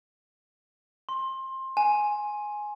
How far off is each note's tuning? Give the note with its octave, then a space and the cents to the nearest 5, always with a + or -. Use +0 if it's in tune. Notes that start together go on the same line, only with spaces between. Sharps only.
C6 +20
G#5 +5